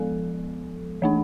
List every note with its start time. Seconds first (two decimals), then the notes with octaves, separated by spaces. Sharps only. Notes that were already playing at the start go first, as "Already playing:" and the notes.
Already playing: F3 G#3 B3 A4
1.02 E3 A3 D4